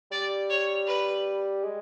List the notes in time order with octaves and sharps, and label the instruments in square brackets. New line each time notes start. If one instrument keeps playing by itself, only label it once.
[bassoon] G3 [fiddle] D5
[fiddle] C#5
B4
[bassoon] G#3